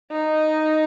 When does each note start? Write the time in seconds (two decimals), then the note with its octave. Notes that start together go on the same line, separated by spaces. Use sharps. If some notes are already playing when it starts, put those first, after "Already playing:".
0.12 D#4